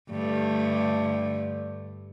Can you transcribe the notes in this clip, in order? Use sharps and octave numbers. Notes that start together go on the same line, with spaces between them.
G2 D3 A3